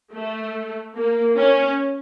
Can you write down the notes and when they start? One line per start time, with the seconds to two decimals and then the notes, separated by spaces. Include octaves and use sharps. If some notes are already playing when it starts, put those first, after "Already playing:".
0.12 A3
0.95 A#3
1.36 C#4